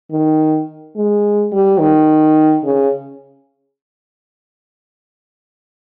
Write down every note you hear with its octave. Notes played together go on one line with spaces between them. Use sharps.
D#3
G#3
G3
D#3
C#3